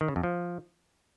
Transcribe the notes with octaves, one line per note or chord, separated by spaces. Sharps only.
D#3
C#3
F2
F3